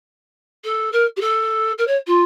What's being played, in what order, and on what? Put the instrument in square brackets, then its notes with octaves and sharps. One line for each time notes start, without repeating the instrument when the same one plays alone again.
[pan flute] A4
A#4
G4
A4
A#4
C#5
F4